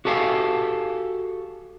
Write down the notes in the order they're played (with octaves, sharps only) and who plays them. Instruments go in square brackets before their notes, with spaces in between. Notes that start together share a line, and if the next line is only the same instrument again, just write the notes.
[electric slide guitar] F#4 G4 A4 B4 F5 G#5